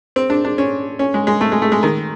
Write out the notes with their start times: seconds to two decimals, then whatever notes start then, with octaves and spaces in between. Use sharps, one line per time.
0.16 C4
0.30 D4
0.45 D4
0.58 C#4
0.99 C#4
1.14 G#3
1.27 G#3
1.41 A3
1.52 G#3
1.62 A3
1.72 G#3
1.83 D#3